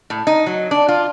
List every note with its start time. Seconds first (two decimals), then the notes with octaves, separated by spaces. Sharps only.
0.10 A2
0.27 D#4
0.46 F#3
0.71 D4
0.88 F4